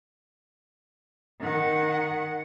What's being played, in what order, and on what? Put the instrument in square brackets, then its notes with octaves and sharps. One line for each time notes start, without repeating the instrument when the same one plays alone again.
[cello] D#3 F#5